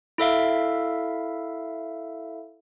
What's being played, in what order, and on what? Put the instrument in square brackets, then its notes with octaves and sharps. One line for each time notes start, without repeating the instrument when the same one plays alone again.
[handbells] E4 A4 E5 F5